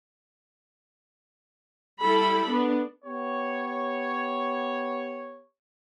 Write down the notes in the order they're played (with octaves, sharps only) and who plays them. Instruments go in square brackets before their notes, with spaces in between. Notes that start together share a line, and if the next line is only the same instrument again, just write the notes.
[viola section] G3 E4 A4 B5
B3 D4
[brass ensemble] B3 G4 C#5